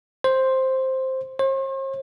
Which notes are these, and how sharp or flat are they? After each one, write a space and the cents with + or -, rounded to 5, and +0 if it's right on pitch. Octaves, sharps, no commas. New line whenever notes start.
C5 +5
C5 +45